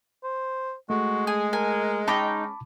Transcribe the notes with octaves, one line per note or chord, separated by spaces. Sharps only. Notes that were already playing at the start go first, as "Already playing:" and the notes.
C5
G#3 A3 F#4
G#4 G#5
A#4 G#5
C#4 D#4 G5 A5 B5 D6